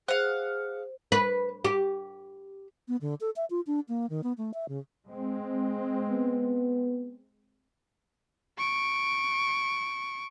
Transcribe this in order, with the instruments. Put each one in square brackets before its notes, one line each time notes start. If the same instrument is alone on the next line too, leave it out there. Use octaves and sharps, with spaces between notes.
[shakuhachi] G#4 [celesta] C5 [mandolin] F5 F#5
[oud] B4
G4
[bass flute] B3
D3
A4
E5
F4
D4
A#3
D#3
B3
A3
E5
C#3
[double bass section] G#3 C4
[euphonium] B3
[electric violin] C#6 D7